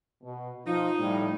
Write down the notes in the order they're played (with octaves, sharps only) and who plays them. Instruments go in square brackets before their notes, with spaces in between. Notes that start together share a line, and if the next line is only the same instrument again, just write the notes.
[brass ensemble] B2
[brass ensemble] F3 F4 [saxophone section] D#4
[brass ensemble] A2 G3